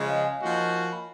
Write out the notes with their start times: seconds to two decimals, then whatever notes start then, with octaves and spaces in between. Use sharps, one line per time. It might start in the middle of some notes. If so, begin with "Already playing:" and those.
Already playing: C#3 F3 G#3 C#5 D#5
0.09 F5
0.24 G#5
0.41 F3 A#3 D#4 F#4
0.93 B5